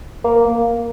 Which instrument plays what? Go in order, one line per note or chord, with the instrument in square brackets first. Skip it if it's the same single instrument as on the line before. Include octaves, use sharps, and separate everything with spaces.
[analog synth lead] A#3